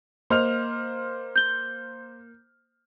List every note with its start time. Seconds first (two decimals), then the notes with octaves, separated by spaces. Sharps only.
0.30 A#3 C5 D#5 F6 F7
1.36 G6 G7